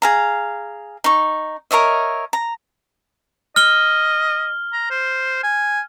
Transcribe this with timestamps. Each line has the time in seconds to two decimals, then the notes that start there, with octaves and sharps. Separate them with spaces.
0.02 G#4 F5 A#5
1.04 D#4 C#6
1.71 A#4 C#5 D#5 E5
2.33 A#5
3.56 D#5 F6 G7
4.73 A#5
4.90 C5
5.44 G#5